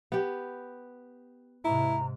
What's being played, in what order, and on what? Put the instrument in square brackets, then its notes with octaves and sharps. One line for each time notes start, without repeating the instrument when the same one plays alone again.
[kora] B3 G4
[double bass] G#2 C3 [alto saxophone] E4 [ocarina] A#5